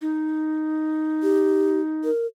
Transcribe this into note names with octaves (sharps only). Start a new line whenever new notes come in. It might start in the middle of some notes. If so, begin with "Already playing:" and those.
D#4
G4
A#4